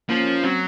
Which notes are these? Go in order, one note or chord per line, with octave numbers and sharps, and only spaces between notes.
F3 A#3 C#4
A#3 C#4
F#3 C4